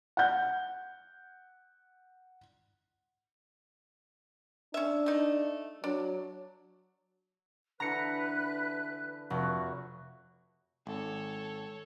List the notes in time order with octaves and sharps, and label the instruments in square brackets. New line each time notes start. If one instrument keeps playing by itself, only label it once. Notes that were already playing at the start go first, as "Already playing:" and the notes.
[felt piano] F#5 G6
[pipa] C#4 E5 [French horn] D4
[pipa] A3 D#4
[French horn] F#3 [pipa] D4
[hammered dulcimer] D3 E3 [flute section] B4 F#6 [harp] A#5 C#7
[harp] F1 [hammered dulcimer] F#4
[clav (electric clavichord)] G#1 [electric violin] A4 C#5